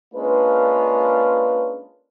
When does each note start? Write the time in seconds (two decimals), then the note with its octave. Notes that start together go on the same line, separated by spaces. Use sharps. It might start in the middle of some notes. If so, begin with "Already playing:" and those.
0.14 G#3 A#3 C#4 D4 F4 B4